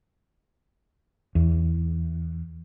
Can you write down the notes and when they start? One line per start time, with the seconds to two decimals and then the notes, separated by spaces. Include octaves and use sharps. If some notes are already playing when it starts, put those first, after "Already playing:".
1.35 E2